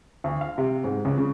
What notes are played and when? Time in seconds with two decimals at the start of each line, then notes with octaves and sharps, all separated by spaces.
0.24 D2
0.41 F5
0.58 C3
0.84 G#2
1.05 C#2
1.17 C#3